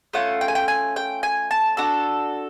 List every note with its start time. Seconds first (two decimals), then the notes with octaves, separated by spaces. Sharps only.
0.13 A3 C#4 F4 F#5
0.41 G5
0.48 G#5
0.55 G5
0.68 G#5
0.96 G5
1.23 G#5
1.51 A5
1.77 D4 F#4 A4